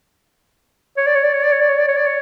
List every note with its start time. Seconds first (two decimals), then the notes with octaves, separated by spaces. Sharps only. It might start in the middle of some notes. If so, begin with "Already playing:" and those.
0.97 C#5
1.07 D5
1.16 C#5
1.24 D5
1.34 C#5
1.43 D5
1.52 C#5
1.61 D5
1.70 C#5
1.79 D5
1.88 C#5
1.97 D5
2.06 C#5